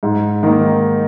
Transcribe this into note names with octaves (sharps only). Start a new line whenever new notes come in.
G#2
D#3 A#3